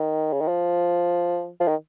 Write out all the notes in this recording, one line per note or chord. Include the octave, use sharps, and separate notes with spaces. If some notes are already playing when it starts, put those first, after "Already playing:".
Already playing: D#3
C#3
D#3
F3
F3
D#3